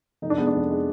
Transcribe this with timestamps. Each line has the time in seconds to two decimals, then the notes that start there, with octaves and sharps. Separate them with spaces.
0.22 F1 D#4
0.30 D4
0.38 G#3 B3
0.47 D4
0.54 F2
0.70 G#3